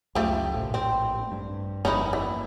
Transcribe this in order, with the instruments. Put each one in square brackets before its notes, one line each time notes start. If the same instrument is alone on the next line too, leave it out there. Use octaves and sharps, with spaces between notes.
[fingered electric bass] C#2 F#2 [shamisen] F3 A3 G4
[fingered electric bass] A#1 A2
[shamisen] C4
[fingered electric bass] G2
[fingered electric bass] G1 F2 A#3 [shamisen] C#4 D#4 E4
[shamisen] E3